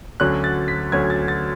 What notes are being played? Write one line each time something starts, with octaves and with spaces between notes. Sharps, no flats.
D2 D3 F#3 C#4 F#6
A6
B6
D2 D3 F#3 C#4 G#6
A6
A6